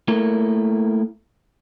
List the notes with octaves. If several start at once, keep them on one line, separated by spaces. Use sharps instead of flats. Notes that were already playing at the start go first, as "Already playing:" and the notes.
A3 A#3 E4 A#4